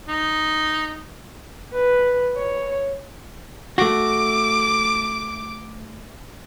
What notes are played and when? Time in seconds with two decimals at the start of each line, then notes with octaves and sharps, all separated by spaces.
0.08 D#4
1.73 B4
2.36 C#5
3.78 A3 F#4 D6